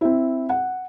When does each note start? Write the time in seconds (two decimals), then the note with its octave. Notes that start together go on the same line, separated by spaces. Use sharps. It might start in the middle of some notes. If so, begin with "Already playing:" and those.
0.01 C4 E4
0.49 F#5